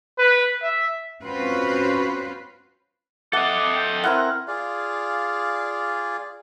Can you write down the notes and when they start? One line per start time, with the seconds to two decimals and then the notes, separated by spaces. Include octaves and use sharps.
0.18 B4
0.62 E5
1.23 C4 C#4 F4 F#4 B4 C5
3.33 A4 D#5 E5 F#5 D6
3.75 G5
4.04 C4 E4 A#4 F#5
4.48 F4 G#4 D5 F5